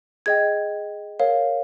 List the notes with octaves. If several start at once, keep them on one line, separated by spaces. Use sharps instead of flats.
G#4 D#5 G5 G#6
A#4 C#5 F5